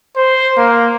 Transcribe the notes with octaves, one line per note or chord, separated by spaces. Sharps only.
C5
A#3